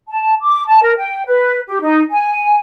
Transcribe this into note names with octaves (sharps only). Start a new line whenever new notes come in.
A5
D6
A5
A#4
G5
B4
G4
D#4
G#5